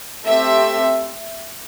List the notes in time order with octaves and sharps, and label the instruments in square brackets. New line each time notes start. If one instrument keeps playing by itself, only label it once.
[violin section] A3 C4 G4 E5